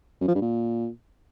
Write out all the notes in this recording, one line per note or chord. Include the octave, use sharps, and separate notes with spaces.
F#2
F3
G2
A#2